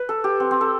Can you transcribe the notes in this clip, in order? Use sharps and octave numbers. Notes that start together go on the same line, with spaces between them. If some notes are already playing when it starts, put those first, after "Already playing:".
Already playing: B4
A4
G4
C4
C4
A4